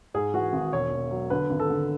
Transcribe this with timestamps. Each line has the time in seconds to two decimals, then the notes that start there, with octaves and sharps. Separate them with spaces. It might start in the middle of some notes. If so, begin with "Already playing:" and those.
0.14 G#2 G#4
0.34 E3 F#4
0.53 G#1
0.73 E1 C#5
0.91 E1
1.11 F#3
1.30 D3 B4
1.50 G#1
1.60 A4
1.70 D3